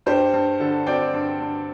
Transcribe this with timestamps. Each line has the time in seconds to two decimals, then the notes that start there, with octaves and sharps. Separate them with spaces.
0.06 G2 G4 C5
0.33 G2
0.60 D3 A4
0.86 C4 D5 G5
1.13 G2
1.40 G2